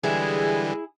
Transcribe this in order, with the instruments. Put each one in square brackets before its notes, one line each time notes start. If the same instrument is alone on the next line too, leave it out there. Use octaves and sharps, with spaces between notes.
[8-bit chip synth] D3 E3 G3 [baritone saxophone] G#3 [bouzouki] E4 G#4